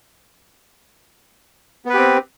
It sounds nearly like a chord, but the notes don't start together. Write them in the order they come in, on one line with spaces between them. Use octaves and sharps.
B3 B4 G4 C4